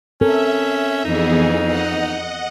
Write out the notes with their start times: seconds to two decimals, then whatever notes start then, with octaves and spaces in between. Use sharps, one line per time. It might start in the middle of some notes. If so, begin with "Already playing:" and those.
0.21 C4 C#4 A4 A#4 E5
1.05 F2 E3 B3 D#4 G#4
1.65 D#5 F#5